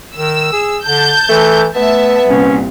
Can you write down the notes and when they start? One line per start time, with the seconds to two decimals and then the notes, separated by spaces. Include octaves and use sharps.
0.16 D#3 E6
0.53 G#4
0.85 D3 A5 G6
1.29 E3 A3
1.75 A3 B3 E5 A5
2.30 C2 A#2 C#4